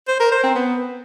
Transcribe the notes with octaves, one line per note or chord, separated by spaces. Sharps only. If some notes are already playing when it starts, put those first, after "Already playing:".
C5
A#4
C5
C4
B3